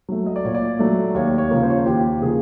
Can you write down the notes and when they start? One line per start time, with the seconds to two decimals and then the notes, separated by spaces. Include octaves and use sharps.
0.09 F#3 A3
0.26 D#5
0.36 D5
0.45 A#2 C#5
0.55 D5
0.79 F#3 A3
1.15 D#2 C#5
1.38 C#5
1.51 C#3 F3 A#3
1.63 C5
1.70 C#5
1.77 C5
1.86 D#2 G4
2.21 C#3 F3 A#3 G#4